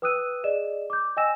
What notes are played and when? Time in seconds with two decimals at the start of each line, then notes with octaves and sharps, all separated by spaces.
0.02 B4 G5 D#6 E6 F#6 D#7
0.44 G#4 D5 D#5 E7
0.90 D6 G6
1.17 D#5 G5 G#5 E6 A#6 E7